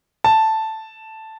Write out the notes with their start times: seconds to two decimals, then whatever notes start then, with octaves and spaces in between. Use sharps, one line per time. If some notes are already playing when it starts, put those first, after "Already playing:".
0.24 A5